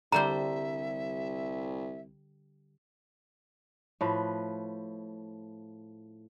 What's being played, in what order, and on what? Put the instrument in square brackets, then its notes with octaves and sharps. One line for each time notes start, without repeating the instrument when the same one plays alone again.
[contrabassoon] C2 [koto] D3 G3 C5 [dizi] E5 [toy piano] A#5
[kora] A2 F3 B4